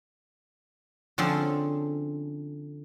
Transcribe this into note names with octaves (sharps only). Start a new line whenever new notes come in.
D3 F3 C4 C#4 G#4 A4